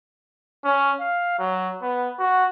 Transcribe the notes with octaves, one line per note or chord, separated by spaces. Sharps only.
C#4
F5
F#3
B3
F#4